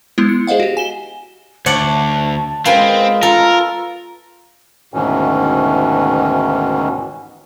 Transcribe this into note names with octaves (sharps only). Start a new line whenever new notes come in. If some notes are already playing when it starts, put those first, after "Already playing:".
G#3 B3 E4
C#7
G#4 C5 D#5 F5 F#5
F#4 G4
G#5 E7 G7
D2 C#5 D5 F#5 A5
G#3 C4 F4 A#4 B4 G#5
F4 A4 A#4 A#5
D2 G#2 B2 D#3 E3 C#4